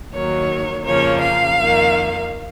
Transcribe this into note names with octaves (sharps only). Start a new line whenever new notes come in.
D#2 D#3 F#3 A#3 C#5
F2 C#3 F3 A#3 C#5
F5
F2 D#3 A#3